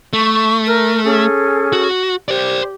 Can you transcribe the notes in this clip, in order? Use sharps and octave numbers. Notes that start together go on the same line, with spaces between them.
A3 C#6
A#4 F6
C#4 G#4 A4
F#4
G4 C5 D5